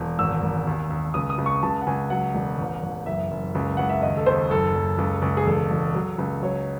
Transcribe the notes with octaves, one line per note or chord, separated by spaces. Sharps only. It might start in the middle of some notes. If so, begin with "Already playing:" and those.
Already playing: E1
G#1 E6
G#1
D#2
D#2
C#2 D#6
D#6
C#2
C#6
C#2 A5
F#5
C#2 G#5
F#3 F#5
E1
A1
A1
F#1 E5
F#1
C#2
C#2 F#5
E5
D#2 D#5
A4
D#2 C5
F#1 A4
F#1
C#2
C#2
G#4
E1 A4
E1
F#3
C#2
F#3 C#5